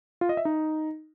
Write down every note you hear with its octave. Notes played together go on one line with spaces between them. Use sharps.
F4
D#5
E5
D#4